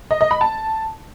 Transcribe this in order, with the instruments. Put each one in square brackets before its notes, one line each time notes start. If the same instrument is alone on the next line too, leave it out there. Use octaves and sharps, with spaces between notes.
[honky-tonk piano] D#5
D#5
B5
A5